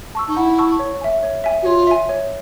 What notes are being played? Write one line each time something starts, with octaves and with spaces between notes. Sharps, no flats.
A5 C#6 E6
D#4
E4 F#5
A5 C#6 E6
C#5
E5 G#5
C#5
E5 G#5
F#4
F4 C#5
E5 G#5
C#5